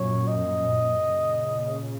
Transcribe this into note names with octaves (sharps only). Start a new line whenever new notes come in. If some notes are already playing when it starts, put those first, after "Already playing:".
Already playing: F#2 A#2 C#5
D#5
A#2 C#3